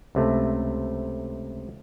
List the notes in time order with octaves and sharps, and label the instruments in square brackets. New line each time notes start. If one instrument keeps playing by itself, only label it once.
[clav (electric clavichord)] C#2 C3 A3